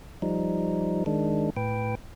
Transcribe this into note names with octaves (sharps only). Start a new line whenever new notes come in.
F3 G3 D#4
D#3 G#3 D4
A2 B4 G5